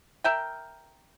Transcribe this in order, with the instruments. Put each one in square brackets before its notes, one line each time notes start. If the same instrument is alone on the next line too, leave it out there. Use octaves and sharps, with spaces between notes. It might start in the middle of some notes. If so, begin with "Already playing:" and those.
[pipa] A#4 E5 G5